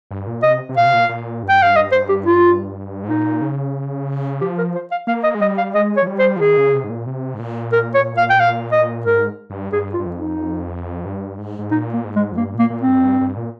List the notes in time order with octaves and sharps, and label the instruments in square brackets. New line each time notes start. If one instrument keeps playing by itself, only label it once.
[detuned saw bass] G2
A#2
[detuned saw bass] C3 [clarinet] D#5
[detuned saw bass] C3
[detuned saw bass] A#2 [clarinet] F5
[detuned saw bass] C3
A#2
A#2
G2
[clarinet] G5
F5
D#5
C5
G4
F4
[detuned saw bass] G#2
[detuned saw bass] A#2 [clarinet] D#4
[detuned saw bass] C#3
[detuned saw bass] F3 [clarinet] G4
[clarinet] A#4
C5
F5
[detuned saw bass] A#3 [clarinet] F5
[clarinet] D#5
[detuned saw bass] G#3
[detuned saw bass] G3 [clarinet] D#5
[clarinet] F5
[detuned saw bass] G#3 [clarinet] D#5
[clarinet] C#5
[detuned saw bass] F3
G3
[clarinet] C5
[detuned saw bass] F3
[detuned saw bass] D#3 [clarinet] G#4
[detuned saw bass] C#3
C3
G#2
A#2
C3
G#2
A#2
[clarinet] A#4
C#5
F5
G5
F5
D#5
[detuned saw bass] G#2 [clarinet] A#4
[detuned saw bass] G2
[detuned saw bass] G2 [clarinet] G#4
[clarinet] F4
[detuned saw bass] G2
F2
[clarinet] D#4
[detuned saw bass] G2
G#2
G#2
[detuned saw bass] A#2 [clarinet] D#4
[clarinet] A#3
[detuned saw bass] G#2
[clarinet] G#3
[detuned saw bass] F2
[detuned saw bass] G2 [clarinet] A#3
[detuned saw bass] A#2 [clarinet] A#3
[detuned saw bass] A#2
[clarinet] C4
[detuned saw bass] G2
F2
G2
G2
A#2